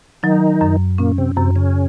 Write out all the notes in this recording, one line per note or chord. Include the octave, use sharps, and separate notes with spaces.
D#3 F#3 D#4
F#2
A#2 A#3 C#4
C3 C4
F#2 C3 C4
C#3 C#4